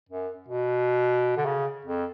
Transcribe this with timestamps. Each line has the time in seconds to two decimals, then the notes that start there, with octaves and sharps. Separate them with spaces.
0.09 F#2
0.49 B2
1.37 D3
1.46 C#3
1.85 F2